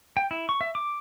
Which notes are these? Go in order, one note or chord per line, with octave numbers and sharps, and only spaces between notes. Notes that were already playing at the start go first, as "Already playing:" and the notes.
G5
E4
C#6
E5
D6